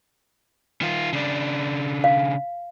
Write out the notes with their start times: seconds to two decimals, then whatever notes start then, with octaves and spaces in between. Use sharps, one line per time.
0.82 D#3 F4
1.13 C#3 D4
2.04 F5